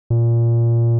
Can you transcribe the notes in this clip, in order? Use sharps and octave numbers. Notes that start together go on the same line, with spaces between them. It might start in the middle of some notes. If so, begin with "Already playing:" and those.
A#2